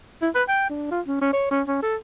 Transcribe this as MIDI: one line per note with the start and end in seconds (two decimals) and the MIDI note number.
0.22 0.30 64
0.35 0.43 71
0.48 0.68 79
0.69 0.86 62
0.91 1.01 65
1.07 1.21 61
1.21 1.29 61
1.33 1.49 73
1.51 1.62 61
1.67 1.78 61
1.82 1.96 69